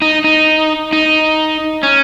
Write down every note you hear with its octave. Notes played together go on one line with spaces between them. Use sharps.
D#4
D#4
D#4
C#4